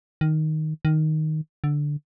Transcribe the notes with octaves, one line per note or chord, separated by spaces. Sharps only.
D#3
D#3
D3